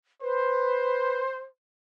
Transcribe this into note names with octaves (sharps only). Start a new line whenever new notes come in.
B4 C5